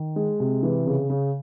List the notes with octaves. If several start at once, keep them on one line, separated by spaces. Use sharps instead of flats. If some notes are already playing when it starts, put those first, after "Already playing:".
Already playing: D#3
G#3
C3
E3
C#3
C#3